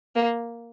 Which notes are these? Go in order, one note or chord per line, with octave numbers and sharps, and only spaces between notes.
A#3